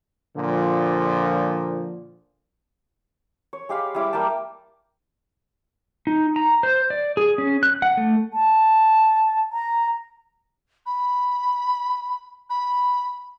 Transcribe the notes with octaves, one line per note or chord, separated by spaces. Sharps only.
A#2 D3 F3
C#5
G#3 G4 F5 B5
G3 E4 D6
G3 A#3 G5 A5
D#4
A#5
C5
D5
G#4
C#4
F#6
F#5
A3
A5
A#5
B5
B5